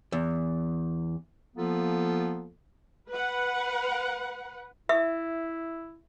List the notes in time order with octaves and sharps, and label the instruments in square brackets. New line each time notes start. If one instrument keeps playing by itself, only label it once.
[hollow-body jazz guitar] E2
[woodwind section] F3 A#3 B3 F4 A4
[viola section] B4 F#5
[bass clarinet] E4 [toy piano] E5